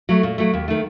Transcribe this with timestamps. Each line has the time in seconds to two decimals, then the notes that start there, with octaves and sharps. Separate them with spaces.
0.09 F#3 A3
0.23 A#2
0.38 F#3 A3
0.53 D#2
0.68 D#3 A3